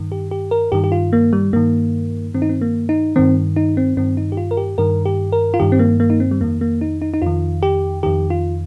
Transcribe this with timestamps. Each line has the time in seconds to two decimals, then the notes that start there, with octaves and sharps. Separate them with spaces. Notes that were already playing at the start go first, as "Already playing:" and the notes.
Already playing: G2 D#3
0.12 G4
0.31 G4
0.51 A#4
0.72 G2 D#3 G4
0.84 G4
0.92 F4
1.13 A#3
1.33 G3
1.53 G2 D#3 A#3
2.34 G2 D#3 C4
2.42 D#4
2.49 C4
2.61 A#3
2.89 D#4
3.16 G2 D#3 C4
3.56 D#4
3.77 C4
3.97 G2 D#3 C4
4.17 D#4
4.32 G4
4.37 F4
4.51 A#4
4.57 G4
4.78 G2 D#3 A#4
5.06 G4
5.32 A#4
5.54 F4
5.60 G2 D#3 G4
5.72 C4
5.79 A#3
6.00 A#3
6.10 D#4
6.20 C4
6.31 G3
6.41 F2 D#3 A#3
6.61 A#3
6.81 D#4
7.02 D#4
7.14 D#4
7.22 F2 D#3 F4
7.63 G4
8.03 F2 D#3 G4
8.30 F4